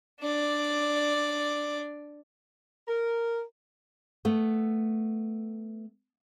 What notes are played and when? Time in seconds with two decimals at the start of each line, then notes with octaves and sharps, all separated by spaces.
0.20 D4 D5
2.88 A#4
4.25 A3 B3